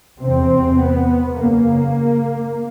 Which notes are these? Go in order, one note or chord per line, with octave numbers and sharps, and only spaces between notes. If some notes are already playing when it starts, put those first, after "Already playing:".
E2 C3 C4
B3
F#2 C#3 A#3